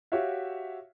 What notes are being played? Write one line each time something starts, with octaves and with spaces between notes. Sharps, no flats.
F#4 G4 C#5 E5 F5